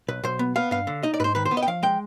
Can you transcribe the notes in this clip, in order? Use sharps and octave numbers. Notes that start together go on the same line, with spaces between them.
B1 B4
B1 C5
B3
B3 F5
G2 F5
D3
D#4 D#5
D5
G#2 B4 C5
D#3 B4
C5
B3
D#5
G5
F3 F5
G#3 G5